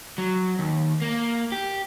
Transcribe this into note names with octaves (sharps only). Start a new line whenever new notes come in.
F#3
D#2
A#3
G4